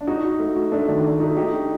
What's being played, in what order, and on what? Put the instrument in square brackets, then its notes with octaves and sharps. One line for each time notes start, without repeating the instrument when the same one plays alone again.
[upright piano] D4
[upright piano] D#4 [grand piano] F#4
[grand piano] F#4
A3
F#4
[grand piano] A3 [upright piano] D4
[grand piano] D#3 [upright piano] D4
[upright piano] D4 [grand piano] F#4
[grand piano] A3 [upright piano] D#4
[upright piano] D#4 G4 [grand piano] F#4
[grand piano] D4